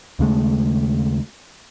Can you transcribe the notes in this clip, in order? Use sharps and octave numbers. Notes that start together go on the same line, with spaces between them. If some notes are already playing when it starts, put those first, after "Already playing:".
D#2 C#3 G#3 A3